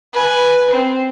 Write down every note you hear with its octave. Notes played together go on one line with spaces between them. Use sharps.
B4 G#5
C4